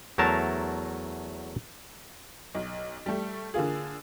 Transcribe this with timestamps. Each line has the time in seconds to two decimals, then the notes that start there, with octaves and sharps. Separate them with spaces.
0.18 E2 F#3 A3 A#4 A5 A#5
2.55 B1
3.06 G3 A3
3.54 D3 A#3 F4 G#4